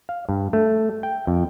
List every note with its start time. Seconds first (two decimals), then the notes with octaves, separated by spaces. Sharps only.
0.09 F5
0.29 G2
0.53 A3
1.03 G5
1.27 F2